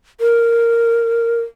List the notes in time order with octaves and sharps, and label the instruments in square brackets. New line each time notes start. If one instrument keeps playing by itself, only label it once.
[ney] A#4